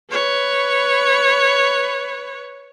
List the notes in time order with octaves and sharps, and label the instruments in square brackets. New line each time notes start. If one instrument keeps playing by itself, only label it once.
[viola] B4 C#5